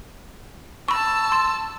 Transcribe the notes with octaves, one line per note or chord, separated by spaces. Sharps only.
A5 B5 C#6 E6
C6